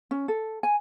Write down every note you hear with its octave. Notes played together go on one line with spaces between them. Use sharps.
C#4
A4
G#5